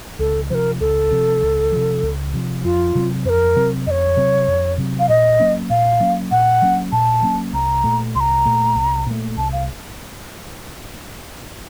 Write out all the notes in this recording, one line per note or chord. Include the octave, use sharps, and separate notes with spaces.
C#2 A4
C3 F3 A#4 C5
C#2 A4
C3 F3
C#2
C3 F3
C#2
C3 F3
F2 F4
C3 F#3 C4
F2 A#4 C5
C3 F#3 C4
F2 C#5 D#5
C3 F#3 C4
F2
C3 F#3 C4
F5
A#2 D#5
F#3 A#3 C#4
A#2 F5
F#3 A#3 C#4
A#2 F#5
F#3 A#3 C#4
A#2 A5
F#3 A#3 C#4
C2 A#5
A#2 A3
C2 C6
A#5
A#2 A3
C2
A#2 A3
C2 A5
F5